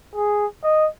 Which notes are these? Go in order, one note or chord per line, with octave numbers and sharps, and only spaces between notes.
G#4
D#5